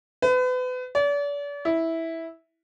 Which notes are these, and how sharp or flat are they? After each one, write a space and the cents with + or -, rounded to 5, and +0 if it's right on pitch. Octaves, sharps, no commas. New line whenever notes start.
B4 +35
D5 -40
E4 -10